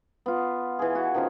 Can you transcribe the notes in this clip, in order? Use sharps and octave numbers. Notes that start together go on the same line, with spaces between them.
B3 F4
E3 G#4
F#4
D#3 F3 C#4